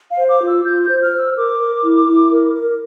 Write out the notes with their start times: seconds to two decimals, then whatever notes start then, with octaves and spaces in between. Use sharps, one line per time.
0.10 F5
0.16 C5
0.29 D6
0.41 F4
0.47 E6
0.65 F4 G6
0.82 G6
0.88 C5
1.00 F6
1.12 C5
1.17 E6
1.35 A#4 D6
1.59 A#4
1.82 E4
2.07 E4
2.31 A#4
2.54 A#4